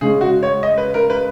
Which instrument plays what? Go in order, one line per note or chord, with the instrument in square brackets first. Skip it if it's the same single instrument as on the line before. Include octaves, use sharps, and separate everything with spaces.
[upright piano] C#3 G#3 C#4 G#4
F#4
C#5
D#5
B4
A#4
B4